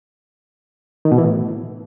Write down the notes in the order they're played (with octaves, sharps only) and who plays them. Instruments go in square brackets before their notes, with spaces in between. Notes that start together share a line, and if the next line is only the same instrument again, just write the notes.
[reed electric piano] D#3
B2
E3
A2